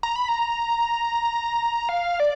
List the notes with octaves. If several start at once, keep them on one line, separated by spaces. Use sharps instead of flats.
A#5
B5
A#5
F5
D5